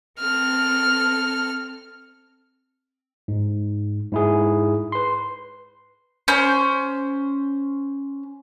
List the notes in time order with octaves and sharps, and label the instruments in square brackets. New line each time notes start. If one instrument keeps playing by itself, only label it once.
[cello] C4 A4 [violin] F6
[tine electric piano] G#2
G#2 E4 G#4
B4 C6
[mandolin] C#4 C5